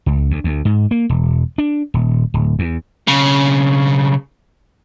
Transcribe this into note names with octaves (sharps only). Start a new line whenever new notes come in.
C#2
D2
D2
G#2
A#3
E1
D4
D#1
D1
E2
B1 C#3